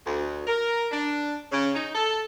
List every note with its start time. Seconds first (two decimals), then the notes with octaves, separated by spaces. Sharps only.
0.06 D2
0.47 A#4
0.91 D4
1.52 C#3
1.75 D#4
1.95 A4